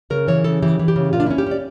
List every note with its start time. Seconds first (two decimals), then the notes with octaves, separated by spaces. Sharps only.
0.10 C#3 A#4
0.28 E3 C#5
0.44 C#3 A4
0.62 E3 G4
0.79 E3
0.88 G4
0.96 C#3
1.13 A#2 F4
1.20 D4
1.26 C#4 E4
1.38 G4
1.47 C#4 D5